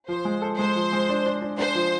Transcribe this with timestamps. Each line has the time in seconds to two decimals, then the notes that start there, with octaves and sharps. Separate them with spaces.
0.08 F3 C5
0.25 G#3
0.42 A4
0.59 G#3 C5
0.75 F3
0.93 G#3
1.09 D4
1.26 D4
1.41 D4
1.58 D4 C5
1.75 F3